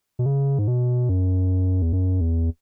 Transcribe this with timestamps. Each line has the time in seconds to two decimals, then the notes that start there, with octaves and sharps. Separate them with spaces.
0.19 B2
0.26 C#3
0.59 G#2
0.68 B2
1.09 F#2
1.82 E2
1.93 F#2
2.21 E2